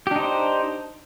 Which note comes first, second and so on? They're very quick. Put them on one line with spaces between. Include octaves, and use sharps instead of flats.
G4 D4 D#4 C5